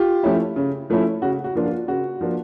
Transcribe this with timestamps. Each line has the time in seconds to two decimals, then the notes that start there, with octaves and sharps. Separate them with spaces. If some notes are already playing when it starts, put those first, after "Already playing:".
Already playing: F4 G4
0.23 F3 A3 C#4 E4
0.56 C#3
0.90 F3 A3 C#4 E4
1.22 C#3 F#4
1.44 F#4
1.55 F3 A#3 D4 F4
1.66 F4
1.88 C#3 F#4
2.21 F3 A#3 D4 F4